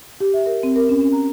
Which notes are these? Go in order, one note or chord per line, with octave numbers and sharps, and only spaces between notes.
G4
E5
A#4
C4
A#4
C#4
C#4
A#5